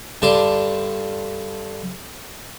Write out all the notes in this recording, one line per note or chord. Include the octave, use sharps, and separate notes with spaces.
G2 D3 D4 A5 C6 D6